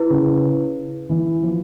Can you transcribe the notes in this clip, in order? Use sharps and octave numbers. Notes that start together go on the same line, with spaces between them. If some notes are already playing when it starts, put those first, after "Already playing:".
Already playing: E4 B4
C#3
E3
F3